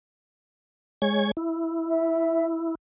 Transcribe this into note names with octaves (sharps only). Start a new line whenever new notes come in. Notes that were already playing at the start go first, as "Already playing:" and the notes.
G#3 C#5 G#6
E4
E5